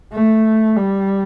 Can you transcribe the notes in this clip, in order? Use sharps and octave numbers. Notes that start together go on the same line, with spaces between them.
A3
G3